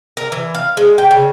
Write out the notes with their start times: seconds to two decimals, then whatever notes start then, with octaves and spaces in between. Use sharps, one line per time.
0.17 A#4
0.32 E3
0.55 F5
0.77 G#3
0.98 G5
1.11 C#3